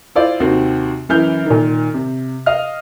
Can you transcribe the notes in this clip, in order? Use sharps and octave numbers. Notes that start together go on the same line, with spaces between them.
E4 F4 C5 D5
D#2 C3 C4 F#4
F#2 E3 F6 G6
A#2 D#3
C3
D#5 F5 F6